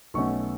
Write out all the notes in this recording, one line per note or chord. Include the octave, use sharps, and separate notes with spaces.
B1 B2 A3 C#4 C#6